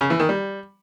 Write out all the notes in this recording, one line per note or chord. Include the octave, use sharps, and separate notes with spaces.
C#3
E3
D#3
G3